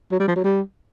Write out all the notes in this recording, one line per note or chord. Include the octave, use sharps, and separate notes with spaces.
F#3
G3
F3
F#3
G3